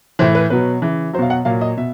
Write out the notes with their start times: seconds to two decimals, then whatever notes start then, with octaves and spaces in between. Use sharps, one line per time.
0.19 A2 E3 C5
0.35 B4
0.50 B2 F#3 B4
0.82 C#3 E3
1.13 F#3 C5
1.19 B2 F5
1.30 F#5
1.45 A#2 F#3 F5
1.61 D#5
1.77 B2 E5